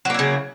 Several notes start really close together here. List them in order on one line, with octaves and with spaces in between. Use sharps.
F#3 A#3 E4 C#3